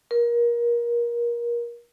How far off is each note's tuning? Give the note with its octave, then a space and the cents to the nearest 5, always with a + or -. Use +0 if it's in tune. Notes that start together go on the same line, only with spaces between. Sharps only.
A#4 +25